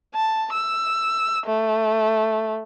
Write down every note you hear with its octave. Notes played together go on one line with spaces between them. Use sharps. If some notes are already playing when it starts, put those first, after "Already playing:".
A5
E6
A3